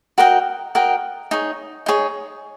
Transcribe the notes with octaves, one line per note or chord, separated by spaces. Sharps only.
F#4 A#4 D#5 G5
F#4 A#4 D#5 G5
D#4 G#4 C#5
D#4 G#4 C#5